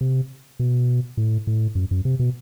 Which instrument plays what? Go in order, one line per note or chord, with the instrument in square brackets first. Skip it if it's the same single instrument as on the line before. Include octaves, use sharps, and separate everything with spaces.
[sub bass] C3
B2
A2
A2
F#2
F#2
C3
B2